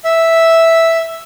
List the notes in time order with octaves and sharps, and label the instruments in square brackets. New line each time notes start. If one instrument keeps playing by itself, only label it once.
[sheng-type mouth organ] E5